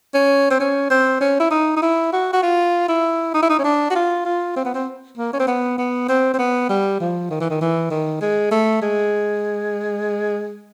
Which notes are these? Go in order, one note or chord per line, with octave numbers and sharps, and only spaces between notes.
C#4
C4
C#4
C4
C#4
E4
D#4
D#4
E4
F#4
F#4
F4
E4
D#4
E4
D#4
C#4
D4
F#4
F4
F4
C4
B3
C4
A#3
C#4
C4
B3
B3
C4
C4
B3
G3
F3
D#3
E3
D#3
E3
D#3
G#3
A3
G#3